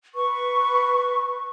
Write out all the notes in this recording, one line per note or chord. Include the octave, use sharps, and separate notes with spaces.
B4 C#6